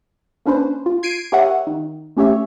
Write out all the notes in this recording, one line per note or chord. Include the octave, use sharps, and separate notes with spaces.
A#3 C#4 D4 B4 C5
F4
G#6 C7 D7 D#7
G4 A#4 C#5 E5 F#5
D#3
A3 C#4 G4 C#5 E5